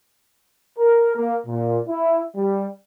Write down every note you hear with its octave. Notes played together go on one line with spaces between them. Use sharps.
A#4
A#3
A#2
E4
G3